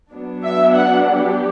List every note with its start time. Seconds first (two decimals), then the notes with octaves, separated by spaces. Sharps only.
0.13 F#3 B3 D4
0.44 E5
0.75 F#5
1.06 G4